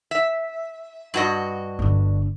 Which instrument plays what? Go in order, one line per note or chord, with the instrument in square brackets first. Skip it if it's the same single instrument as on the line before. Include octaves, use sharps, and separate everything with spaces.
[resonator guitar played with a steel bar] E5
G2 F#4 D#5
[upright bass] G1 D3